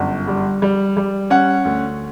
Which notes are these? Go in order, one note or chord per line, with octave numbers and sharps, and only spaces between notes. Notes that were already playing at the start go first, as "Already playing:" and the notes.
Already playing: G1 F#2
G3
G3
G3
C#4 F#5
D2